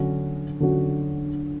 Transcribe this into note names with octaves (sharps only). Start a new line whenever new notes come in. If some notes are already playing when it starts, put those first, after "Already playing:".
Already playing: D3 F#3 C#4 F#4
D3 F#3 C#4 F#4